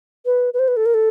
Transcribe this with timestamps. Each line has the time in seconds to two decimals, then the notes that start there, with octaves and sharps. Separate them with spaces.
0.26 B4
0.54 B4
0.59 C5
0.68 B4
0.77 A4
0.86 A#4
0.94 A4